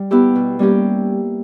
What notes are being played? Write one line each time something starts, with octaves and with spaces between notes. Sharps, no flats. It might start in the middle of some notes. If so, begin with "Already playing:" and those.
Already playing: G3
B3 E4 G4
B2
G3 A#3 C#4 G4